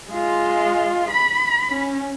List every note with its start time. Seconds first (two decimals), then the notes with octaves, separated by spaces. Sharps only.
0.10 G#3 F4
1.11 B5
1.71 C#4